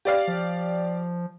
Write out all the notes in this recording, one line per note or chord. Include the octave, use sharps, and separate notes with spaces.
G4 D5 F5
F3